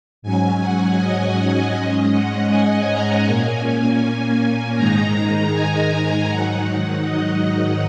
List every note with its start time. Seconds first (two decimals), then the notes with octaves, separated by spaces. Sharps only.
0.22 G#2 F#3 C#4 G#5
0.60 F#5
0.98 D#5
1.36 D#5
1.74 G#2 G#3 C#4 D#5
2.11 F#5
2.50 G#5
2.88 A#5
3.25 A#2 A#3 C#4 G#5
4.76 G#2 D#3 G#3 D#4 A#5
5.14 A#5
5.52 G#5
5.91 G#5
6.28 G#2 D#3 F#3 D#4 F#5
6.66 F#5
7.04 D#5